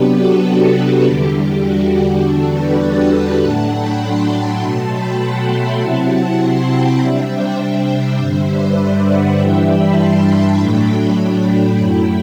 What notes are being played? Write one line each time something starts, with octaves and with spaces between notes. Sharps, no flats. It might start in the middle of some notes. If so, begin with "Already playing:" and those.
Already playing: C3 F#3 B3 D4 G4 B4
F#4 A4
F#4
F#4
E2 D3 G3 G4
F#4
G4
E2 D3 G3 D4 F#4 A4
G4 B4
F#5 A5
A2 F#3 A3 D4
G5 B5
A5 C6
B2 F#3 A3
G5 B5
F#5 A5
E5 G5
C3 F#3 C4 E4 F#5 A5
A5 C6
G5 B5
C3 G3 D4 E5 G5
C5 E5
C5 E5
G2 D3 G3 C5 E5
B4 D5
B4 D5
D5 F#5
G2 E3 G3 D4 E5 G5
G5 B5
A5 C6
G5 B5
A2 F#3 A3 D4
G5 B5
F#2 F#3 A3 E4